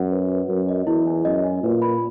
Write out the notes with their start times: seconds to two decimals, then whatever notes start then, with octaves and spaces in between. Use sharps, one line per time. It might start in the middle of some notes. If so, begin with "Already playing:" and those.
Already playing: F#2 F#5
0.12 B4
0.30 B4
0.49 F#2 A#4
0.69 D#5
0.87 E2 E4
1.07 G#5
1.25 F#2 D#5
1.44 G#5
1.63 A#2 B4
1.82 B5